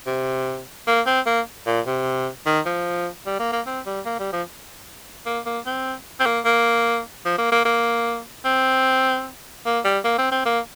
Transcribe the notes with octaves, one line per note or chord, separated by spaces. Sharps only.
C3
A#3
C4
A#3
A#2
C3
D#3
F3
G3
A#3
A#3
C4
G3
A#3
G3
F3
A#3
A#3
C4
C4
A#3
A#3
F3
A#3
A#3
A#3
C4
A#3
G3
A#3
C4
C4
A#3